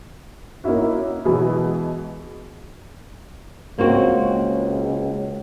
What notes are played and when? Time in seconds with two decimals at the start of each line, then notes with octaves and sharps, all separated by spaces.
0.64 A#3 C#4 D#4 E4 F#4
1.25 B2 E3 F#3 G#3 B3 G#4
3.78 C#2 A#3 C4 F#4